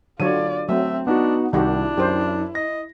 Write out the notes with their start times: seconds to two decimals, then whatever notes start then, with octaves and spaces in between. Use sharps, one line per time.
0.20 D3 F#3 F4 C#5 D5 D#7
0.69 F#3 A3 C4 E5
1.07 B3 D4 D#4 F#4 F#5
1.53 C2 D#3 D4 E4 F#4 G4
1.98 F#2 G4 C5
2.55 D#5 A#6